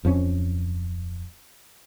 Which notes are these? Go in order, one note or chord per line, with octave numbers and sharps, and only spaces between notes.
D1 F2 F3 C#4